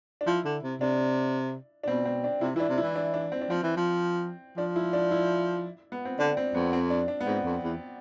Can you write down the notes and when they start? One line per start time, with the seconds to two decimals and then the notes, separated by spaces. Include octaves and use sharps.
0.21 D4
0.26 F3 E4
0.45 D3
0.63 C3
0.80 C3 D4
1.84 D4
1.88 B2 C4
2.05 C4
2.24 D4
2.41 C3 E4
2.55 E3 E4
2.60 D4
2.69 C3
2.78 E4
2.82 E3
2.96 D4
3.14 D4
3.32 C4
3.41 D4
3.49 F3 C4
3.63 E3
3.77 F3
4.57 F3 D4
4.76 E4
4.93 D4
5.11 E4
5.92 B3
6.05 C4
6.19 D3 D4
6.37 C4
6.54 F2 B3
6.73 C4
6.90 D4
7.08 D4
7.21 B3
7.26 G#2 C4
7.44 F2
7.63 E2